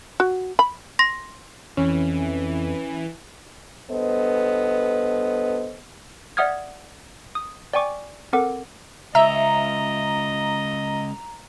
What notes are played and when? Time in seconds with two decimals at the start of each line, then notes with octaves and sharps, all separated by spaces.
0.20 F#4
0.59 B5
0.99 C6 A#6
1.77 F2 E3 C#4
3.90 G2 B3 A4 C5 D#5
6.37 D5 E5 F#5 D#6 F6 G#6
7.35 D#6
7.73 D5 G5 G#5 C#6 D6
8.33 C4 A4 A#4 F#5 D6
9.15 C#2 D#5 E5 A#5